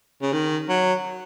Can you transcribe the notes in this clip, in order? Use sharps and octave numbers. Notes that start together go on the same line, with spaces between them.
C#3
D#3
F#3